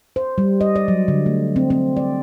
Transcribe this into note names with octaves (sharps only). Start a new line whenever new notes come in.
C5
G3
D#5
D5
F#3
D3
A3
C4
C4
D5